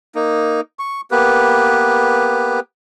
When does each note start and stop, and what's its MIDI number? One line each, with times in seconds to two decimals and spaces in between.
0.15 0.61 58
0.15 0.61 63
0.79 1.01 85
1.11 2.60 58
1.11 2.60 59
1.11 2.60 67
1.11 2.60 71